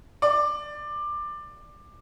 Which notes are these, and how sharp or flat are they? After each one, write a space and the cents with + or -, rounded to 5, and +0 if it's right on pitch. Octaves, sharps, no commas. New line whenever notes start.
D5 +15